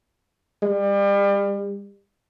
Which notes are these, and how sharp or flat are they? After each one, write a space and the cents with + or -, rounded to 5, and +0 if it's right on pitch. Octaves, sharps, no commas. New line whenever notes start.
G3 +35